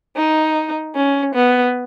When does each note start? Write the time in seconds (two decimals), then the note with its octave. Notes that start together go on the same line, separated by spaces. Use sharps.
0.17 D#4
0.95 C#4
1.35 B3